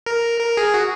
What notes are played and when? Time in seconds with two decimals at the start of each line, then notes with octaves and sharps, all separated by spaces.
0.06 A#4
0.40 A#4
0.57 G#4
0.74 F#4